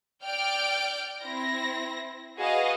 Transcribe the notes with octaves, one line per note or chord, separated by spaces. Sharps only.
D5 G5 F6 G6 D7
C4 E4 A#6
F#4 G#4 B4 D#5 F5